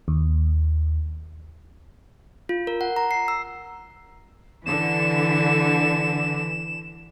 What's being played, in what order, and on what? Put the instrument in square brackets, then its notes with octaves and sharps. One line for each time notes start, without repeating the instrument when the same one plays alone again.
[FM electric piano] D#2
[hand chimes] F4
A#4
F#5
A#5
C7
E6
[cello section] D3 [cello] E3 [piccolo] E7